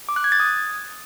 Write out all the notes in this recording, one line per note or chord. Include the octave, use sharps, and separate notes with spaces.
D6
F#6
G#6
A6
D#6